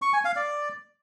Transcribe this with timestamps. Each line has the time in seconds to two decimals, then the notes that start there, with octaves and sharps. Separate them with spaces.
0.02 C#6
0.13 G#5
0.25 F5
0.36 D5